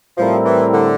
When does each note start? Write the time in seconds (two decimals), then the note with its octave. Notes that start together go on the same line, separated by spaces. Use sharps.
0.17 A2 F3 G3 C4 E4 A#4
0.45 E3
0.73 D3